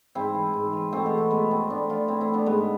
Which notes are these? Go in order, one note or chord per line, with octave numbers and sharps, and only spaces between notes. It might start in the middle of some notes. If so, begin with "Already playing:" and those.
G#2 C4 E4
E3
G#2
E3
B2 A3 C4
G#3 B3
A3
B2 G#3 B3
A3 C4
A2 B3 D4
F3 D4 F4
A2 C4 E4
C4 E4
F3
B3 D4
G#2 G#3 B3